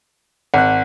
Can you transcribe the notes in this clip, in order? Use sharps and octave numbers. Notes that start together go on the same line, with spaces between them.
G#1 F#5 F#6